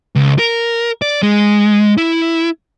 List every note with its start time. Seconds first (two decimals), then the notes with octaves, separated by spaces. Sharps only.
0.16 C#2
0.39 A#4
1.02 D5
1.22 G#3
1.98 E4